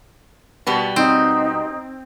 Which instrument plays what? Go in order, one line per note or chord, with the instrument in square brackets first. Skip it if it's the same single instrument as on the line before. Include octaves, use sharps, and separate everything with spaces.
[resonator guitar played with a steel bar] B2 G3 B3
[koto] C4 [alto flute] D#4